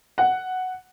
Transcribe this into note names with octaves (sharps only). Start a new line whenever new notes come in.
F#5